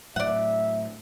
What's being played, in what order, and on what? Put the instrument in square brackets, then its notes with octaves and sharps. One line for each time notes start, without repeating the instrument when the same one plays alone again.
[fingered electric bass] A2 F#3 [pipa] D5 F#5 [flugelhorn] E5